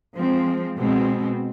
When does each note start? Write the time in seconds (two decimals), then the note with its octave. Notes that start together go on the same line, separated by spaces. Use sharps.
0.16 F3 G#3 C4
0.76 B2 G#3 C4